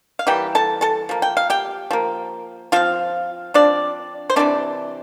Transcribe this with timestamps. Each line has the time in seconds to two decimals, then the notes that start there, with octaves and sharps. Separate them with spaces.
0.19 F5
0.27 E3 G3 A#3 G4 G5
0.55 A4 A5
0.81 A4 A5
1.09 F3 A#3
1.22 G5
1.37 F5
1.50 G4 G5
1.91 F3 A#3
2.72 F3 C4 F4 F5
3.54 F3 C4 D4 D5
4.30 C5
4.36 C3 E3 A3 C4 D4 D5